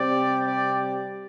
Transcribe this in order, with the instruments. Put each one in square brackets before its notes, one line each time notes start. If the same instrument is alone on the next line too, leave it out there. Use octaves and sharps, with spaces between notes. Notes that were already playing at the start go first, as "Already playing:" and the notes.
Already playing: [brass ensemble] C3 G3 C4 G4 [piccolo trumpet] D5
[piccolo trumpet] D5